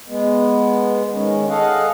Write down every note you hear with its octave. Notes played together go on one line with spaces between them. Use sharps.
G#3 B3
D#3 G#3 C#4
G#4 A4 D#5 F5 F#5